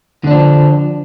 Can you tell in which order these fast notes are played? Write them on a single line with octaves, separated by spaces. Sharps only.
D3 D4 F3